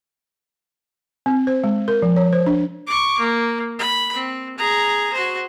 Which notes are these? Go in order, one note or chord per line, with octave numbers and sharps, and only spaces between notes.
C4
C5
G#3
A#4
F3
C#5
C5
D4
C#6 D6
A#3
B5
C4
G#4 A#5
F#4 C5